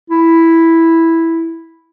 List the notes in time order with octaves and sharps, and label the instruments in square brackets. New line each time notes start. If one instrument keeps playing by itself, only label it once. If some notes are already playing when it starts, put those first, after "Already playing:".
[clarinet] E4